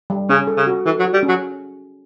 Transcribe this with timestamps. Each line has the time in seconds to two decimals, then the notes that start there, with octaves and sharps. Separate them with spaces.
0.10 G3
0.29 C#3 C#4
0.47 A4
0.57 C#3
0.67 F#4
0.86 E3 A4
0.99 F#3
1.05 F#4
1.13 G3
1.23 C#4
1.28 F#3